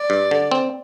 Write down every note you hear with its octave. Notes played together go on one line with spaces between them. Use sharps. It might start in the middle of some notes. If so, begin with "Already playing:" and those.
Already playing: D5
G2
D3
C4